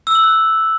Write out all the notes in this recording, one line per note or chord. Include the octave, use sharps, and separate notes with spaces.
E6
F#7
F#6